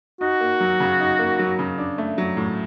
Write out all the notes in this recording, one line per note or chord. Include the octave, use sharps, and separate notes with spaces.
D#4 F#4
A#3
F#3
C#3
D#4
A#3
F#3
C#3
D4
A3
F#3
A2